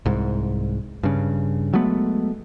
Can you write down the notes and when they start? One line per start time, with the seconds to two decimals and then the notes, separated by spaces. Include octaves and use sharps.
0.06 C2 G#2
1.03 G2 C#3
1.73 F#3 G#3 A3 B3